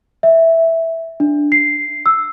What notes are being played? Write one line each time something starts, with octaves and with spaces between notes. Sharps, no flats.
E5
D4
C7
E6